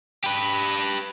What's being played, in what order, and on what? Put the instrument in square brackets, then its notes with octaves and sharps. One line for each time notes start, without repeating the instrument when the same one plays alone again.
[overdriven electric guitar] G4 B4